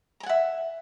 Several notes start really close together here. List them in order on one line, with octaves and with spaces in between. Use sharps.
A#5 G#5 F#5 E5